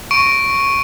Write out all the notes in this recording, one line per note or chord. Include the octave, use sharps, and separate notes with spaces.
C#6 D7